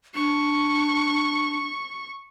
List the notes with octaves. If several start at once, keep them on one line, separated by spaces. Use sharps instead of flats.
D4 C#6